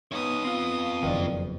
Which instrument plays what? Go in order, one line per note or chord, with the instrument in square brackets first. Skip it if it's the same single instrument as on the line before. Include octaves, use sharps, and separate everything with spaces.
[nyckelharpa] B3 D#6 [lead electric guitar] D#4 C#5
[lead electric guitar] C4 F4
[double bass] F#1 F2 [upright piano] D#3 D4